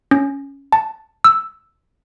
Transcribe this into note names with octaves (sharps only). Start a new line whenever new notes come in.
C#4
A5
E6